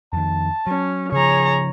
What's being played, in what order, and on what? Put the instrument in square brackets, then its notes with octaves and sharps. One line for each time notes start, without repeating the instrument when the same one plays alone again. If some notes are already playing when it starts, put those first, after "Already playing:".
[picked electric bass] F2 D#3 [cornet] A5
[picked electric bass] F#3 [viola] C#4
[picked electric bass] C#3 F3 [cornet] G#4 [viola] C#5 A#5